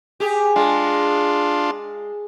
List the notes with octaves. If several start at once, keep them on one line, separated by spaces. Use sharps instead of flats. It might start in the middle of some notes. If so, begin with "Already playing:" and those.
G4 G#4
G#3 D4 F4